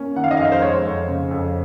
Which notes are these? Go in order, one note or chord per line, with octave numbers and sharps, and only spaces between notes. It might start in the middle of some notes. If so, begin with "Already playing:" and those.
Already playing: A#3 C#4
D#3 F#5
F5
D#5
F2 F5
C5
G#3 C#5
F2
C#3
F2